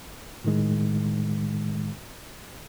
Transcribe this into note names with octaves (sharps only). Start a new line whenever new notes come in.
A2 D#3 G#3